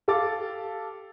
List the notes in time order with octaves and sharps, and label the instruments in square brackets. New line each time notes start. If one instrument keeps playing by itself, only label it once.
[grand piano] G4 A4 F5 D6 A6